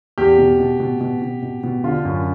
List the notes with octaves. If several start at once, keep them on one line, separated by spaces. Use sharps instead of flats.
E2 G4
B2
B2
B2
B2
B2
B2
B2
D3 F4
F#2